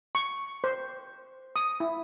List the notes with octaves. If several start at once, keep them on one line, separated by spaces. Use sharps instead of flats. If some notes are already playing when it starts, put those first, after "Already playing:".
C#6
C5
D#6
E4